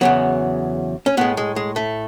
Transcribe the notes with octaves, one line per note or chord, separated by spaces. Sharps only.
E2 C#3 F#3 B3
C#4
A2 G#3 B3
G#3
G#3
A3